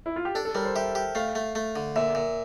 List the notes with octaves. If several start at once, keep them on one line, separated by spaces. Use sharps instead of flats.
E4
F4
G4
D4 A4
A4
G3 A#4
C5
G4 E5
G4
A3 F5
A3
A3
D3
A#2 E5
A#2